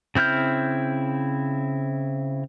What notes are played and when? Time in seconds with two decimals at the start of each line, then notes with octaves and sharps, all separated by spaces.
0.15 C#3 C4 E4 F6 G6